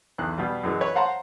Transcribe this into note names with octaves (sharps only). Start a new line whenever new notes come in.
B1 E2 F#6
B2 G3
F#2 E3 G#3
B4 C#5
C5 F5 F#5 A5 A#5 C6